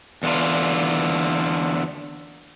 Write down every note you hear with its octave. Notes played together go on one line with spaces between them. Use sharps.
E2 D3 F4